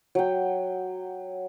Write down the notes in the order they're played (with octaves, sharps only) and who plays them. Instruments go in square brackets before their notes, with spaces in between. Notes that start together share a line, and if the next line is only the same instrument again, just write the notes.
[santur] F#3 G5